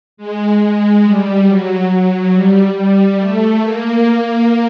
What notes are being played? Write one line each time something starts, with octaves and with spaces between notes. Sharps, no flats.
G#3
G#3
G3
F#3
F#3
G3
G3
A3
A#3